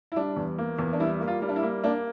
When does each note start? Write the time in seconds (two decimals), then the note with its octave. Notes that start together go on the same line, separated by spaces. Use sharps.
0.12 E4
0.16 G3 D4
0.36 E2
0.58 A#3
0.79 E2
0.93 D4
1.00 G3 E4
1.20 A#3
1.28 F4
1.42 G3
1.49 D4
1.56 E4
1.63 A#3
1.84 A#3 D4